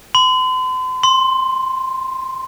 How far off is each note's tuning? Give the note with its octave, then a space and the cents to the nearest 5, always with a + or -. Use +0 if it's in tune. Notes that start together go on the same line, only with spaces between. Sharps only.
C6 -45
C6 +5